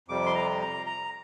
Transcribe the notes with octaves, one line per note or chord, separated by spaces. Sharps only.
F2 C3 G3 D6
C6
A#5
A#5
A#5